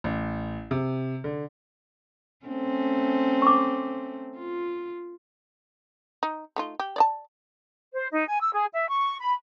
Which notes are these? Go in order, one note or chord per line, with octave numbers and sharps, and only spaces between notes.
A1
C3
D3
A3 C4 C#4
C#6 D6
F4
D#4
A3 D#4 F4
G4
D5 D#5 A5
C5
D#4
G#5
E6
G#4
E5
C#6
B5